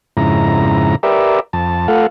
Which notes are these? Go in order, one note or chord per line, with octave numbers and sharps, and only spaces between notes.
F2 G#2 C#3 E4 A#5
G4 A#4 B4 D5 E5
F2 A5
A3 F4 A4 F5 F#5